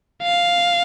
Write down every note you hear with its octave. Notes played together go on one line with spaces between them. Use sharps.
F5